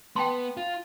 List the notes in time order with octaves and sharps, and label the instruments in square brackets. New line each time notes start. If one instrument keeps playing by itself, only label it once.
[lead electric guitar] B3 [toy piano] G5 A5 C6
[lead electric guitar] F4